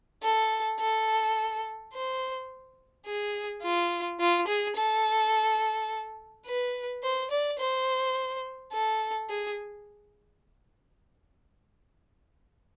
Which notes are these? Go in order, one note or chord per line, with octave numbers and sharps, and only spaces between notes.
A4
A4
C5
G#4
F4
F4
G#4
A4
B4
C5
D5
C5
A4
G#4